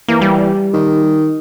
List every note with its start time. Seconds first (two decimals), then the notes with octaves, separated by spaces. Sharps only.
0.08 E3 A#3
0.21 G3
0.74 D#3